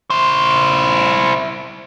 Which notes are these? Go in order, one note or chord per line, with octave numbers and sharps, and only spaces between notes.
E4 C5